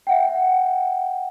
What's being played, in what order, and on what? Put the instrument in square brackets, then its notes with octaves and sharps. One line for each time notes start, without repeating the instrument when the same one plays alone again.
[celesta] E5 F#5 G5